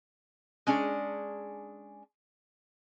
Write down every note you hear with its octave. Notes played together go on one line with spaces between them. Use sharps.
G#3 C#4 D4 G#4